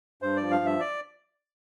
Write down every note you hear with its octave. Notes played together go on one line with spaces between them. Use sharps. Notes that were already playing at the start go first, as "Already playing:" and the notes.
G2 C5
F3 D5
F5
G2
E5
D5